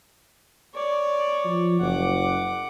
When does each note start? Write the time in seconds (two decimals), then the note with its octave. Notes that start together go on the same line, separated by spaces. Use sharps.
0.74 C#5 D5
1.45 F3
1.81 F#1 F#5 D6